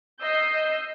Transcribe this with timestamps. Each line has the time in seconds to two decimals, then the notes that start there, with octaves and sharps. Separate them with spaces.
0.22 D#5 E6 G6 C7